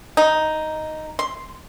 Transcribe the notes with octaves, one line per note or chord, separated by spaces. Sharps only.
D#4
C6